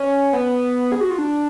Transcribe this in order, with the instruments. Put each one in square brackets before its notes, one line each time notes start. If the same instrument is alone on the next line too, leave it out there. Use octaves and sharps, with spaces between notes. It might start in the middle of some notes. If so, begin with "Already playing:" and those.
Already playing: [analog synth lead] C#4
B3
G#4
F#4
F4
D4